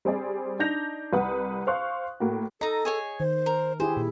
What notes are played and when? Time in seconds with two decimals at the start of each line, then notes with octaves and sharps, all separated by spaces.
0.05 G3 C4 G#4 D5
0.59 D4 D#4 G6 A#6 F7
1.13 C2 B4 F#5 D#6
1.67 C5 F5 C6 C#6 F#6
2.20 A2 A#3 F#4
2.61 D#4 A4 D#5 A#5
2.85 G#4 C#5 G#5
3.20 D#3 C5
3.46 A#4
3.80 E4 G4 G#4 C5 G#5
3.97 A#2 E4